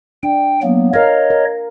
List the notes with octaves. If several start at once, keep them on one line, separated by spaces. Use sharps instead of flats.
D4 G5
F#3 A#3 B3
A#4 C#5 D#5 F5
A#4